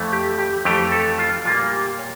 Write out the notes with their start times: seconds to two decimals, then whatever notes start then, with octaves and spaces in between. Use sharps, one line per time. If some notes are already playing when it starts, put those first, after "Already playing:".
Already playing: F2 E3 A3
0.12 G4
0.39 G4
0.65 F2 E3 A3 G4
0.92 A4
1.19 F4
1.45 A#2 G3 A#3 F4
1.72 G4
1.99 C#5